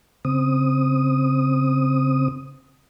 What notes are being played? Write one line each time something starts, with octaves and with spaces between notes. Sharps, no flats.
C#3 C4 D#6